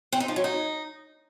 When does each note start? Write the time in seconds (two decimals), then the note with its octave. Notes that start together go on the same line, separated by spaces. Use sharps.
0.12 C4
0.20 D#4
0.28 F3
0.36 F#3
0.44 D#4